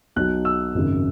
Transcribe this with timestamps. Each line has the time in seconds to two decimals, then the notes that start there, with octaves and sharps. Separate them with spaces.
0.16 B1 B2 F#3 F#6
0.45 E6
0.74 G#1 F#2 C#3